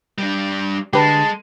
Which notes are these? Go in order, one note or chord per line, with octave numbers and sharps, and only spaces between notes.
G3 D4
D3 G#3 G4 B4 A5